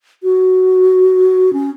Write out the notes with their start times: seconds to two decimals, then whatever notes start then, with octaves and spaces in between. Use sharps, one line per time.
0.23 F#4
1.53 C#4